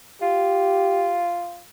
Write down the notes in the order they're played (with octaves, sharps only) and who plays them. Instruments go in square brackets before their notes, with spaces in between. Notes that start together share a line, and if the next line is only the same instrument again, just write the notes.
[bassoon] F4 [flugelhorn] G4